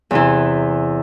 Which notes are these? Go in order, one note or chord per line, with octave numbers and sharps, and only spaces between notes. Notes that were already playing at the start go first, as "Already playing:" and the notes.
E2 C3 E3